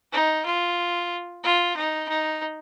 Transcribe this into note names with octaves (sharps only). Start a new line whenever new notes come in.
D#4
F4
F4
D#4
D#4